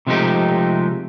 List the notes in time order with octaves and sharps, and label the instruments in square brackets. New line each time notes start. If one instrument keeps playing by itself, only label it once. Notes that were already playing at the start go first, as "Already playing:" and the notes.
[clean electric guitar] C3 F3 G#3 A3 D#4 G4